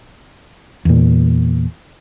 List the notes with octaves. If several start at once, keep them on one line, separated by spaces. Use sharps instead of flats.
E2 A#2